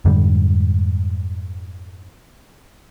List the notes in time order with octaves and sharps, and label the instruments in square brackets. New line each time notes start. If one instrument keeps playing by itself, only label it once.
[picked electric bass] F2 G#2 D3 G3